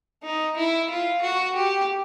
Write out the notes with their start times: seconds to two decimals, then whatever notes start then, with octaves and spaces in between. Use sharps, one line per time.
0.24 D#4
0.57 E4
0.90 F4
1.22 F#4
1.55 G4